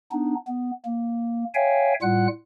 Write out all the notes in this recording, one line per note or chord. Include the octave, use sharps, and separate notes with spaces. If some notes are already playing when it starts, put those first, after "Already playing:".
B3 D4 D#4
B3
A#3
C#5 E5 F5 G5 G#5
A2 G3 F4 F#5 F#6